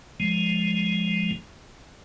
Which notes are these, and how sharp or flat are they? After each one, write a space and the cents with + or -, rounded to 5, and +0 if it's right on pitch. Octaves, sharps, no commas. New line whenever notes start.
F3 +5 G#3 +0